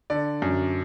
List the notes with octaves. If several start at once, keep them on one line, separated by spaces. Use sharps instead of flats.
D3 D5
F#2